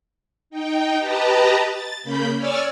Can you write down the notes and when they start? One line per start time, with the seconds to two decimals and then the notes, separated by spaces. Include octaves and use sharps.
0.50 D#4 G5
0.98 G4 B4 D#5 A5 A#5
1.69 A6
2.03 C#3 A#3 B5 G6
2.36 C#5 D5 G#5 E6 F6 A6